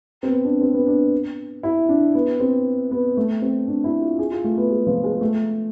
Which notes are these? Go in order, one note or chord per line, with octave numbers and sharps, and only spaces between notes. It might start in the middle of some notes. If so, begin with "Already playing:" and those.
C4
B3
D4
C4
B3
D4
E4
D4
B3
C4
B3
A3
C4
D4
E4
F4
G#4
F4
A3
B3
G#3
F3
G#3
A3